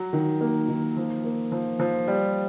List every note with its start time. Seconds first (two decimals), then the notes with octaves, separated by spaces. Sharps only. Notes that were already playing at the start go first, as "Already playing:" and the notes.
Already playing: F#3
0.13 D#3
0.41 A#3
0.69 D#3
0.97 F3
1.24 A#3
1.52 F3
1.79 F3
2.07 G3